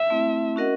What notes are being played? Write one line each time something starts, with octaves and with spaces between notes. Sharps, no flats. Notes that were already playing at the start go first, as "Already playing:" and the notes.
Already playing: E5
A3 C4 E4
C#4 F#4 A#4 D#5 F#5